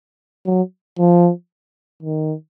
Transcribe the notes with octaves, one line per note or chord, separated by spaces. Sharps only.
F#3
F3
D#3